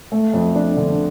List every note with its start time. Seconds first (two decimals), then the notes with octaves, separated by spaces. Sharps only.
0.12 A3
0.34 F2
0.56 D4
0.77 D3